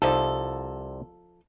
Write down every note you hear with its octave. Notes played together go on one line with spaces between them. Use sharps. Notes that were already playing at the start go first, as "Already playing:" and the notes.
C2 C3 F3 D#4 A4